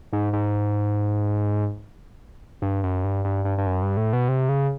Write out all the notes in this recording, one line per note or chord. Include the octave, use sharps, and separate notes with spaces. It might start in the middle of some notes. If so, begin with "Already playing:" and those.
G#2
G#2
G2
F#2
G2
G2
G2
G2
F#2
G2
A2
B2
C3
C#3